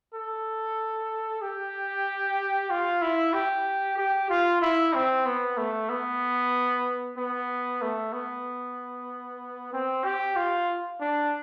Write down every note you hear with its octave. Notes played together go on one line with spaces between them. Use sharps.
A4
G4
F4
E4
G4
G4
F4
E4
C4
B3
A3
B3
B3
A3
B3
C4
G4
F4
D4